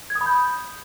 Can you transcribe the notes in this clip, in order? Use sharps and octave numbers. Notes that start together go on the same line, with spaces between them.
G#6
D#6
B5
G6